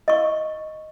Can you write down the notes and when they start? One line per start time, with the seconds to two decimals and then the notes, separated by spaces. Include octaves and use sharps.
0.08 D#5 C#6